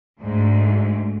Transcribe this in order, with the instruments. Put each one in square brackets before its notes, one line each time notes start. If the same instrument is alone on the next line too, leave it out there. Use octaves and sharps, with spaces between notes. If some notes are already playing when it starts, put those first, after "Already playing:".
[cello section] D2 G#2